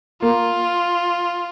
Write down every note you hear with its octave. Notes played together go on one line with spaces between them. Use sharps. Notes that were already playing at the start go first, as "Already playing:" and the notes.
A#3 F4